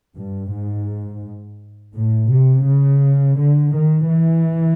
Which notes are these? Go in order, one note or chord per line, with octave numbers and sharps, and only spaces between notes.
G2
G#2
A2
C3
C#3
D3
D#3
E3